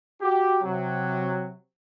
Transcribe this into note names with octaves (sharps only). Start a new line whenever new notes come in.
F#4 G4
C3 F#3